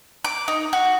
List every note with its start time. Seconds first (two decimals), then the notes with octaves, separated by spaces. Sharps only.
0.24 D6
0.48 D#4
0.73 F#4